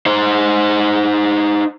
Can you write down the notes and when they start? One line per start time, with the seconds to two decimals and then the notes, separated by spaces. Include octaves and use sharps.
0.06 D#4 C5